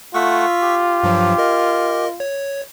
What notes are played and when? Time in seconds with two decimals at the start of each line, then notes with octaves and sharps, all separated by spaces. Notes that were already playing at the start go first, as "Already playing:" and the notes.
0.14 A3 F4 F#5 C#6 E6 B6
0.62 G4
1.03 G2 F3 F#3
1.38 A#4 D#5
2.20 C#5